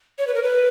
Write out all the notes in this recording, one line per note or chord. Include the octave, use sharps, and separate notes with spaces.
C#5
B4
A#4
B4